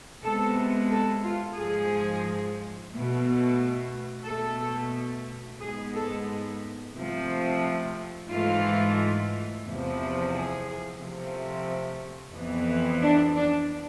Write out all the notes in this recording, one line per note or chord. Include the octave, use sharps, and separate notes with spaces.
C3 G#3 B3 A4
A4
F4
G#2 F3 G#3 G#4
B2 A3
B2 A3 A4
G#2 G#3 B3 G#4
A4
C3 F3 A3
G#2 E3 A3 F4
E2 C3 F3
G#4
C3 F3 A3
F2 E3 B3
D4
D4